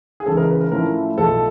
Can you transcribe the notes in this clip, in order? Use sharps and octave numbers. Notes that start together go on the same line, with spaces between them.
G#4
C#2 C#3 E3 G#3 C#4 A4
A#4
B4
A#4
A2 F3 A3 C#4 E4 A#4
B1 A2 F3 A4